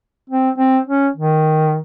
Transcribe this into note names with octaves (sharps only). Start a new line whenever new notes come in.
C4
C4
C#4
D#3